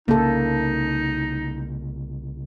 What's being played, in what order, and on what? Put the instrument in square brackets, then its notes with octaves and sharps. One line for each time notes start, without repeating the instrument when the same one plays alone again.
[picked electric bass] C2 C#3 [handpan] A#3 A4 [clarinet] D#4